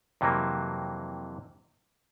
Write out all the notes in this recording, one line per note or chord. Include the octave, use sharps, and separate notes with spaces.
F2 C3 E3 F#3 A#3